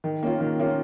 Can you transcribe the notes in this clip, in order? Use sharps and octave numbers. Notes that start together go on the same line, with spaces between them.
D#3
A#3 C#4 F4
D#3
A#3 C#4 F4